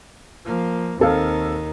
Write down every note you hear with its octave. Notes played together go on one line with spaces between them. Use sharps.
F3 A#3
D#2 D#3 C4 A4 F5